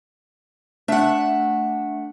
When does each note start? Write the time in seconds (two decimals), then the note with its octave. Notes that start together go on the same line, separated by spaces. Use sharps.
0.88 A3 D4 E5 F#5